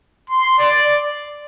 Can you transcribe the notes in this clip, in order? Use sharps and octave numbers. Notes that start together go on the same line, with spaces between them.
C6
D5